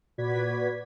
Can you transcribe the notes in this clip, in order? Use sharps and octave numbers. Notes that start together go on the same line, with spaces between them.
A#2 F#4 B4 D5 G#6 B6